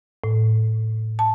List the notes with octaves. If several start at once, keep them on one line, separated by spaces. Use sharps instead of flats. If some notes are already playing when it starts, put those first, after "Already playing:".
A2
A5